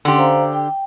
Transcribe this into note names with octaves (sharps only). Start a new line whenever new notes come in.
D3 C#4 G4 F#5 C6
C5 F5 A#5
G5